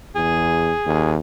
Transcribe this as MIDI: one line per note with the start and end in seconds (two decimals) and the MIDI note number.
0.15 0.72 40
0.15 1.12 68
0.86 1.19 39